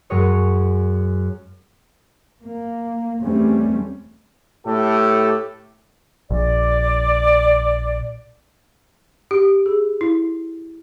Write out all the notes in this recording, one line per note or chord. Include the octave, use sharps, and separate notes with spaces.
F#2 F#3 G#3 C#5 D#6
A#3
E2 G3 A3 C4 C#4
A2 G4 A4
A#1 D5
G4
G#4
E4